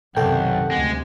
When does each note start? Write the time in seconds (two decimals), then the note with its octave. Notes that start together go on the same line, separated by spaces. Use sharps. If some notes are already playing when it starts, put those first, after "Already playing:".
0.16 B1 F#2 C3 D#3 A4 F#5 G5
0.71 D2 C3 G#3